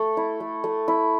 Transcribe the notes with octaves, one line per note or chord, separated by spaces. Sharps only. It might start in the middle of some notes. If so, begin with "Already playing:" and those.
Already playing: A3 A4
E4
A3
A3
E4